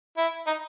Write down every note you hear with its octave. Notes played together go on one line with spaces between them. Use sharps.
E4
D#4